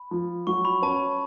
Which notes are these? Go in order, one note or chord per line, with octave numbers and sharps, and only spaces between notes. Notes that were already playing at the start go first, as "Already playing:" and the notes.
Already playing: B5
F3
F#3 C#6
B5
C#4 A5